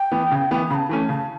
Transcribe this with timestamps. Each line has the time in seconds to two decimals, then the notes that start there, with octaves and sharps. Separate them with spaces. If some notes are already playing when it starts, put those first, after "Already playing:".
Already playing: G5
0.11 E3 B3
0.32 C#3
0.51 E3 B3
0.69 C#3 A5 B5
0.89 E3 A3 C#4
1.08 C#3 A5